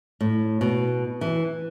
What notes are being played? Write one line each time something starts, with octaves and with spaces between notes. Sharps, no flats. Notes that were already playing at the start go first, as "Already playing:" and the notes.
A2
B2
E3